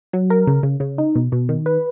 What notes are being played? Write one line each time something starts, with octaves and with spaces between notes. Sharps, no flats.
F#3
A#4
C#3
C#3
C#3
D#4
B2
B2
D#3
B4